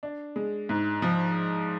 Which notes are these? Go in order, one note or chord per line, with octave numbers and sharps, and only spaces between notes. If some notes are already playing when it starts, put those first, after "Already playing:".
D4
G#3
G#2
F3